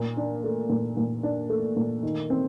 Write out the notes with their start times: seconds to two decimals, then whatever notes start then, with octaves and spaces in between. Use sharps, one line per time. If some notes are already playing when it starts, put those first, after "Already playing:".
Already playing: A#2
0.17 D4
0.44 A3
0.70 A#2
0.97 A#2
1.23 D4
1.49 A3
1.77 A#2
2.03 D#3
2.30 C4